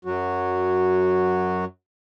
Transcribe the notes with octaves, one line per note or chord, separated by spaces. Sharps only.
F#2 F#3 F#4